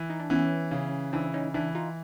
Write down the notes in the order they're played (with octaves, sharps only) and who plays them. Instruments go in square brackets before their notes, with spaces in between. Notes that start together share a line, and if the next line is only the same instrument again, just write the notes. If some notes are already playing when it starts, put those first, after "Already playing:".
Already playing: [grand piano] E3
[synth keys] D#4
D4
[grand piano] E3 [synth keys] B3 C#4
[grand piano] C#3
[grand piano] E3 [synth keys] C4 D4
[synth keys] C#4 D#4
[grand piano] E3 [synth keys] D4 E4
[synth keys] D#4 F4